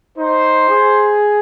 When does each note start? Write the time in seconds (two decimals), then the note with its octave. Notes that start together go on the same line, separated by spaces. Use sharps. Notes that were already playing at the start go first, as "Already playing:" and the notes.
0.17 D#4 C5
0.69 G#4